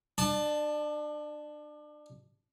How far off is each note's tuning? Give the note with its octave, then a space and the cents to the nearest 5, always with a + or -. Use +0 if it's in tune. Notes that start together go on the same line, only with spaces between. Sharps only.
D4 +30 A5 +0